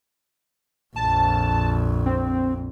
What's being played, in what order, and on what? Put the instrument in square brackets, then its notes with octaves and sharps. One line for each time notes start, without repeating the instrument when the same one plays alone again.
[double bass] A#1 F2 [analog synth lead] A5
[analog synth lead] C4